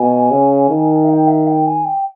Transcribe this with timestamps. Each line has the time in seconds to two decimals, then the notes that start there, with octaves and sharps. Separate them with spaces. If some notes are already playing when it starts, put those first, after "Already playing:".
Already playing: B2 G#5
0.31 C#3
0.70 D#3
1.03 E5
1.09 G5
1.27 E5
1.47 G5
1.66 G#5
1.85 G5